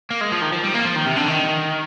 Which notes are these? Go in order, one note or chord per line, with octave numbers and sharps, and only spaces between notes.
A#3
G#3
F3
D#3
F3
G3
A#3
F3
D#3
C3
D3
D#3